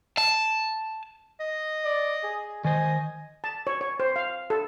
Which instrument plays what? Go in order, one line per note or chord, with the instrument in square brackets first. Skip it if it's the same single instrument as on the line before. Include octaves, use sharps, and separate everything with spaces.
[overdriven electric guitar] A5
[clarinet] D#5
[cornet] D5
G#4
[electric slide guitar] D#3 C5 [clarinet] D#5 [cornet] G#5
[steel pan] A5
C#5
C#5
C5
F5
A4